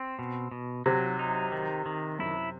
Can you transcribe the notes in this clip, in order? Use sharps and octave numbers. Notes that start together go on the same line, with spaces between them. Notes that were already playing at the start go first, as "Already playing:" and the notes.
Already playing: C4
B2
B2
C3 F#3
D#4
D#3
D#3
F#2 E4